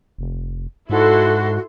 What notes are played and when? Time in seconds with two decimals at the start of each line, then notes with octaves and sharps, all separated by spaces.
0.19 F1
0.90 G#2 E4 F#4 A4 C6